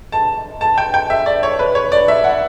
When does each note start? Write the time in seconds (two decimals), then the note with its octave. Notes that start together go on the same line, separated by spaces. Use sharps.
0.12 A5
0.61 A5
0.78 G5
0.94 G5
1.10 E5
1.26 D5
1.43 C#5
1.59 B4
1.75 C#5
1.92 D5
2.08 E5
2.24 F#5